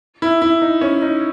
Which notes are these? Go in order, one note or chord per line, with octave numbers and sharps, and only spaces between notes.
E4
E4
D#4
C#4
D#4